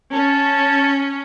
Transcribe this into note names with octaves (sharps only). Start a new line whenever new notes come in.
C#4 A5